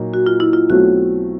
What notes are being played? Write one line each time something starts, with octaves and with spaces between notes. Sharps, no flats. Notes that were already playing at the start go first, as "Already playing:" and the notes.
Already playing: A#2 F#3 A#3 D#4
F#4
F4
E4
F4
B1 B2 F#3 A3 C4 F#4